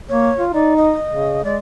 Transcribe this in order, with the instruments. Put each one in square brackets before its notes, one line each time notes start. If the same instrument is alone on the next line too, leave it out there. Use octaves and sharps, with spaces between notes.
[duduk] A#3 [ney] C#5
[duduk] F4
[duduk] D#4 [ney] D5
[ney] D#5
[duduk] C#3
[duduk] G#3 [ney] D5